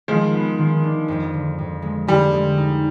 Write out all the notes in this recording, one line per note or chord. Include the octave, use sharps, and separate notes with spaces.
D#3 F3 G#3
B3
D#3
D4
F2
D3
F2
G#3
D3 G3
G#3
D#4